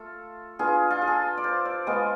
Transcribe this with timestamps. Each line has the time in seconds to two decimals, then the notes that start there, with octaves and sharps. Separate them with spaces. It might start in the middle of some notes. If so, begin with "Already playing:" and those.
Already playing: A3 F4 A4
0.59 B3 D4 F4 G#4
0.91 F4
1.01 G#4
1.08 A4
1.37 D5
1.44 C5
1.65 D5
1.87 G#3 B3 F4